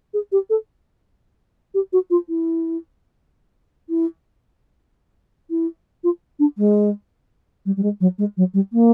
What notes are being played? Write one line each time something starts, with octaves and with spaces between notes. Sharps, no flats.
G#4
G4
A4
G4
F#4
F4
E4
E4
E4
F4
D4
G#3
G3
G3
G#3
F#3
G#3
F#3
G3
A#3